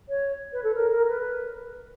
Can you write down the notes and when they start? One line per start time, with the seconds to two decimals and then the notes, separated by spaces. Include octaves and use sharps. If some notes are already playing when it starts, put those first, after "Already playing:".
0.08 C#5
0.52 B4
0.63 A4
0.74 A#4
0.90 A#4
1.08 B4